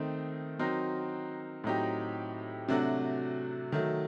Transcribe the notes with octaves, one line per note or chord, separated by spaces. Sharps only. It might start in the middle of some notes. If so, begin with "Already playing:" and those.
Already playing: D#3 A3 C4 D#4
F#3 C4 D#4 F#4 A#4
A2 F#3 C4 D#4 G4
C3 F#3 A3 D4 F#4
D#3 F#3 A3